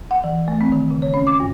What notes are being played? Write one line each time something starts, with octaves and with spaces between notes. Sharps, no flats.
F#5
E3
A3
C4
D#3
C#3
C#5
C#4
D6
G2